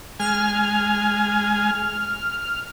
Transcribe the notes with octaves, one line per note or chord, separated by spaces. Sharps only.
G#3 G#5 F6